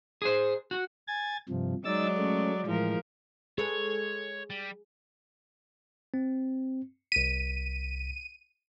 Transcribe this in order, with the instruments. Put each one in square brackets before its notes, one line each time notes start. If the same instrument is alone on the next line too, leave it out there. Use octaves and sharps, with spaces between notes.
[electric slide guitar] G#4 C5
F#4
[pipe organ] G#5 G#6 A6
G2 C3 F3
[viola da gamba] F#3 G#3 D5 [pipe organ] D#4 E6 A6
[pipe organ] A3 C#4
[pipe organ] A2 E3 G#3 [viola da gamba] F3 A#4
[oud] G#3 A4 B4 [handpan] G#4 [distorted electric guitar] C#5
[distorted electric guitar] G3
[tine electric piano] C4
[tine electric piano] C2 B6 [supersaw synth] D#7